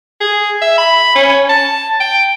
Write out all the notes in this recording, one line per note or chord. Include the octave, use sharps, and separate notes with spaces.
G#4
E5
B5
C#4
A5
G5